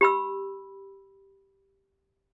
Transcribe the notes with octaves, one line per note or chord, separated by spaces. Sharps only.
G4 B5 E6